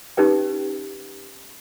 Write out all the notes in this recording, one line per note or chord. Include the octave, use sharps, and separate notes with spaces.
C#4 D#4 G4 B4 G5